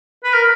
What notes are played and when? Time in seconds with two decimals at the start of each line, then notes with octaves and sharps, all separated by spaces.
0.24 B4
0.33 A#4